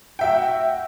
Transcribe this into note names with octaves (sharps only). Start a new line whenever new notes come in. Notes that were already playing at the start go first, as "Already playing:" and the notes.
F#4 E5 G5